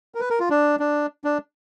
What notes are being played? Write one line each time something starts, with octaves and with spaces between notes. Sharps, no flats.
A#4
B4
A#4
F4
D4
D4
D4